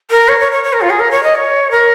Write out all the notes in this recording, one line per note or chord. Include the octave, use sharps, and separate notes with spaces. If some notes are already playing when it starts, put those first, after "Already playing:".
A#4
C#5
C#5
C#5
C#5
A#4
F4
G#4
A#4
C#5
D#5
C#5
A#4